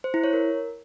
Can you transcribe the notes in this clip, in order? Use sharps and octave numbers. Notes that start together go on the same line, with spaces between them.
C5
E4
C#5
A#4